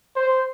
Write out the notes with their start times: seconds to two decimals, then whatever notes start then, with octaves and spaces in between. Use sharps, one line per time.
0.16 C5